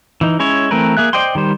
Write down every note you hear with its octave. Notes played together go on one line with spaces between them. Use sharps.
E3 D#4
G#3 C#4 E4 C#5
E3 A3 C4 A#4 B4
A#3 G#4 E5 F#6
C5 D5 D#5 G5 C6
D#3 G3 C5